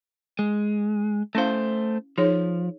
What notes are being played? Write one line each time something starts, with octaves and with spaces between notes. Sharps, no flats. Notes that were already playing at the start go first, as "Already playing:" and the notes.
G#3
A3 C#4 E4 C5 F5
F3 D#4 G#4 C#5